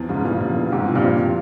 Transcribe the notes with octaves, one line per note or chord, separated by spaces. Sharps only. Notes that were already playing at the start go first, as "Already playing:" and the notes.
Already playing: E2 F3
G#2 C#3
E2 G2 A#2
F3
E2
G#2 C3 G4
F3
G2 A#2
C4
F3